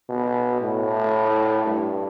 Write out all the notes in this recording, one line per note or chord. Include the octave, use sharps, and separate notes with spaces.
B2
A2
G2